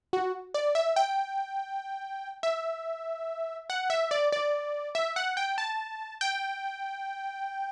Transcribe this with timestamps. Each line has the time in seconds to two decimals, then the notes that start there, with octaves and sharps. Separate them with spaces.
0.13 F#4
0.54 D5
0.75 E5
0.96 G5
2.43 E5
3.70 F#5
3.90 E5
4.11 D5
4.32 D5
4.95 E5
5.16 F#5
5.37 G5
5.58 A5
6.21 G5